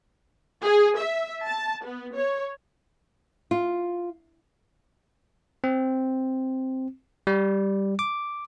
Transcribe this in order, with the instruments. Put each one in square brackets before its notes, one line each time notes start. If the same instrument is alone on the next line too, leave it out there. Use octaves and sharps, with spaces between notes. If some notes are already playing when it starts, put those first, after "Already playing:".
[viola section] G#4
E5
A5
B3
C#5
[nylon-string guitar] F4
[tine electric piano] C4
G3
D6